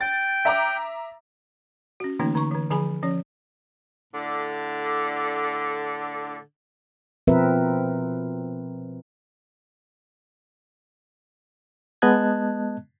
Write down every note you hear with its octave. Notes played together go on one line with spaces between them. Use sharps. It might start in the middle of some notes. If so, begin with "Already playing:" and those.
G5 A6
E5 A#5 D6
C#4 F#4
D3 E3 A3 A#3 C#4 D#4
D3 D#4 A#5 C#6
D3 E3
D3 F3 G#4 G#5 B5
F3 C#4 C#5
A2 D3
B2 F3 C4 A#4 B4 E5
G#3 B3 D#5 A5 F#6 G#6